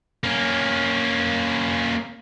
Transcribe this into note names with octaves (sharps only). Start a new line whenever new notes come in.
A#3 C#4